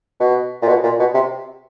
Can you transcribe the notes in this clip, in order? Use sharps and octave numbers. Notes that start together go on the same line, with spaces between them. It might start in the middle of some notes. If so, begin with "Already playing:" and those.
B2
A#2
B2
A#2
B2
C3